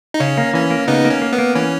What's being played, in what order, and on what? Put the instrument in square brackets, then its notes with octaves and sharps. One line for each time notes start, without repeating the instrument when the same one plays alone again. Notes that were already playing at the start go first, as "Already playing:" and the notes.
[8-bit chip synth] D#4
[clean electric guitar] C#3 [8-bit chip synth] C#4
[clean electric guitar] A#3
[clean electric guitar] E3 [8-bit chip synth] C#4
[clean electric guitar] A#3
[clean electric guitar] C#3 [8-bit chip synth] B3 D#4
[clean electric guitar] A#3
[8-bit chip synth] C#4
[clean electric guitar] A#3
[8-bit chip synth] B3
[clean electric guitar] A#3
[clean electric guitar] E3 [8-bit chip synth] C#4